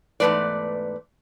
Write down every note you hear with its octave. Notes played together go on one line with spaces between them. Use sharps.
E2 G#2 D#3 A3 B4 D5